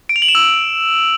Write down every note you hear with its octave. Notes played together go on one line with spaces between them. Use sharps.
D7
F7
F#7
E7
E6